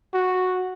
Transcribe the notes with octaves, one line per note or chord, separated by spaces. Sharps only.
F#4